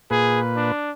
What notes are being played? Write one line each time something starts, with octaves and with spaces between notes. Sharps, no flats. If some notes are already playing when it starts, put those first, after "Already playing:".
A#2 G#4 B4
D4